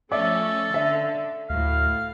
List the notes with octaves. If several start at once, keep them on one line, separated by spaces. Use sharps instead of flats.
F3 A3 C#4 A4 D5 E5 D6
D3 E5
D2 A2 F5